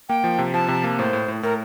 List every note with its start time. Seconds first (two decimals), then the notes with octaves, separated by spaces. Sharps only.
0.09 A#3 G5
0.24 F3
0.38 C3
0.54 F3 A5
0.68 C3
0.84 A#3
0.99 A2 C5
1.13 A2
1.28 A2
1.43 A2 A#4